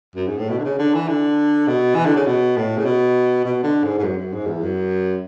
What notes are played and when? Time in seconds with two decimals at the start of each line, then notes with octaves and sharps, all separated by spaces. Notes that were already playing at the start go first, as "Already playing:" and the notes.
0.16 F#2
0.28 G#2
0.38 A2
0.49 B2
0.59 D3
0.65 C#3
0.79 D3
0.94 E3
1.09 D3
1.68 B2
1.95 E3
2.06 D3
2.16 C#3
2.27 B2
2.57 A2
2.77 C#3
2.85 B2
3.45 B2
3.63 D3
3.84 G#2
3.99 G#2
4.03 F#2
4.18 F#2
4.33 G#2
4.47 E2
4.63 F#2